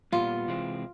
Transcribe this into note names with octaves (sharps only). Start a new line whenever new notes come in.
A#2 G3 B3 F4
C3 E3 G#3 C4